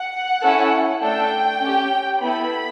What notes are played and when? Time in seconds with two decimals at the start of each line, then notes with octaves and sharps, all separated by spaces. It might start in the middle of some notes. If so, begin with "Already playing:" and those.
Already playing: F#5
0.41 C#4 E4 A4
1.01 A3 D4 A4 G5
1.61 C#4 G4
2.20 B3 E4 A4 B5